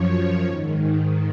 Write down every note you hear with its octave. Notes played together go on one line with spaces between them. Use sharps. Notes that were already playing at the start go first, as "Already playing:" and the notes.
Already playing: F#2 F3 C#5
G#2 D#3